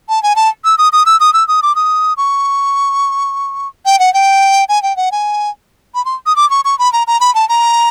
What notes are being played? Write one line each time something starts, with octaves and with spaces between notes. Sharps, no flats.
A5
G#5
A5
E6
D#6
D#6
E6
D#6
E6
D#6
D6
D#6
C#6
G5
F#5
G5
G#5
G5
F#5
G#5
B5
C6
D#6
D6
C#6
C#6
B5
A#5
A#5
B5
A5
A#5